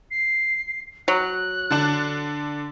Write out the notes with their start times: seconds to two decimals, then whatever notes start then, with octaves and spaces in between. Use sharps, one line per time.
0.11 C7
1.08 F#3 F#6
1.71 D3 D4